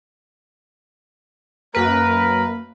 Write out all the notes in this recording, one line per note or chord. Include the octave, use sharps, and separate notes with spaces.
F#2 A#3 A#4 B4